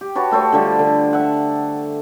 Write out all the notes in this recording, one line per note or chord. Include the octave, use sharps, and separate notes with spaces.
G4
F#4 B4 C#5 A5
A3 A4 C5 C#5
D3 F3 G3
D3
E5 F#5